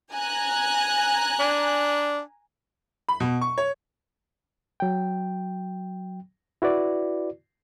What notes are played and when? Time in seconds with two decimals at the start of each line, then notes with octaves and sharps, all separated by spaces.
0.13 G#5 A#5 F#6
1.39 D4
3.09 B5
3.20 B2
3.41 C#6
3.58 C#5
4.80 F#3 G5
6.62 E4 F#4 B4 D5